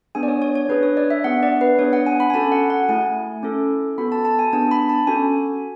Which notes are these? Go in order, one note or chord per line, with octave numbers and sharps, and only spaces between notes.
B3 D4 G#4 G#5
D5
C#5
C#5
C#5
D4 G#4 B4
C#5
D5
E5
B3 D4 G#4 F#5
D5
B4
B3 D4 G#4 C#5
F#5
G#5
B5
G#5
C#4 F#4 A4 A5
F#5
F#5
A3 E4 G#4 G#5
C#4 E4 A4
B3 F#4 A4 B5
A5
A5
G#5
B3 D4 G#4 A5
B5
A5
C#4 F#4 A4 G#5